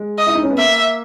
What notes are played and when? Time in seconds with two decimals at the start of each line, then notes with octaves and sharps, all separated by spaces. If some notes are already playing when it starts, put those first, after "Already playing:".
Already playing: G#3
0.18 D#5
0.27 E4
0.35 D#4
0.43 C#4
0.50 B3
0.58 A#3 E5